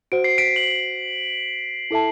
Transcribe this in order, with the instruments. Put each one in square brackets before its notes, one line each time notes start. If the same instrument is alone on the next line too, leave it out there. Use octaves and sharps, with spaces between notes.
[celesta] F#4 C5 F#5 [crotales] D7
[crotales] C7
B6 D7
D7 F#7
[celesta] E4 A4 E5 A5